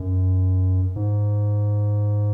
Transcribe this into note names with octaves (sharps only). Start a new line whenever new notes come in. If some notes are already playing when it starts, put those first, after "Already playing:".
Already playing: F#2
G#2